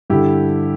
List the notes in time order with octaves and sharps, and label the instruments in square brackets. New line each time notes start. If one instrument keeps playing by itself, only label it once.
[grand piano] G2 D3 E4 G4